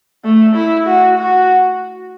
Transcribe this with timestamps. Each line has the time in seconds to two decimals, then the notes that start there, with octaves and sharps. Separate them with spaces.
0.25 A3
0.56 E4
0.86 F#4
1.17 F#4